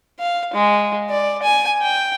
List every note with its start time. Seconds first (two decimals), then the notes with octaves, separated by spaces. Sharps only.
0.20 F5
0.54 G#3
1.10 D5
1.43 G#5
1.82 G5